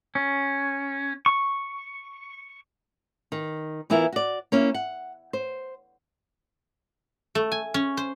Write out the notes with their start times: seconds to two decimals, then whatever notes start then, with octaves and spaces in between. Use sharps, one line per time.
0.15 C#4
1.26 C#6
3.32 D#3
3.90 E3 B3 E4 F4 A#4 E5
4.12 F#4 D5
4.52 A#3 C#4 E4
4.74 F#5
5.33 C5
7.35 A3
7.52 G#5
7.74 C#4
7.97 C5